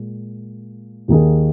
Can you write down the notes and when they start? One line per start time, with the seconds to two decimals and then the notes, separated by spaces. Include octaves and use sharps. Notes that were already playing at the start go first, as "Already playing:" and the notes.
Already playing: A#2 G#3
1.08 D#2 D#3 A#3 D#4 G#4